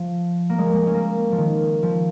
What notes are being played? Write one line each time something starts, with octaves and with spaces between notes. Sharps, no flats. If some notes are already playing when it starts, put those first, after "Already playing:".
Already playing: F3
A#3
G#3
F3
G#3
C#4
A#3
F3
D#3
F3